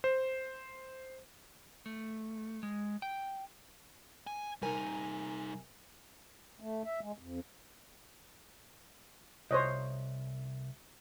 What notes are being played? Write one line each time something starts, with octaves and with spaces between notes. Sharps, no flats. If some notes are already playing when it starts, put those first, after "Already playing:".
C5
A3
G#3
G5
G#5
C3 G3 D#4 A#4 G#5
A3
E5
G#3
F2
C2 C5 C#5 D#5